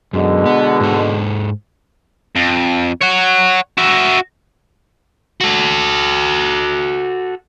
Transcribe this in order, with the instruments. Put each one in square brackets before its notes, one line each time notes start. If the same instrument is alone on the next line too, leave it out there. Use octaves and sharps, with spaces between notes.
[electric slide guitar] F#2 [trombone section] B2 D3 G#3
[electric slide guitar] B3
G#2 A4
[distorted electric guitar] F2
C#5 F#5
F#4 E5
[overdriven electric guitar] F#4 A4